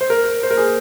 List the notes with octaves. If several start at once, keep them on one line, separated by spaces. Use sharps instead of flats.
C5
A#4
C5
A#4
G#4